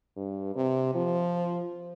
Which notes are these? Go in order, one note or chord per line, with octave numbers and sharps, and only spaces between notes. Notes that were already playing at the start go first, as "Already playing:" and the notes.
G2
C3
F3